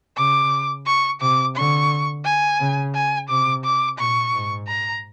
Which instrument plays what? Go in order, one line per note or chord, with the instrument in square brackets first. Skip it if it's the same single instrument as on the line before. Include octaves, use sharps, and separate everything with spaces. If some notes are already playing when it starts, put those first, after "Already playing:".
[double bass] C#3 [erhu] D6
[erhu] C#6
[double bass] C3 [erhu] D6
[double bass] D3 [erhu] C#6
[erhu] G#5
[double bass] C#3
[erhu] G#5
[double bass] C3 [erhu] D6
[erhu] D6
[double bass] A#2 [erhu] C#6
[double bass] G#2
[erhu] A#5